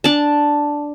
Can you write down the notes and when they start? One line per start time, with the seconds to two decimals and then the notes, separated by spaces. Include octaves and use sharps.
0.04 D4 A5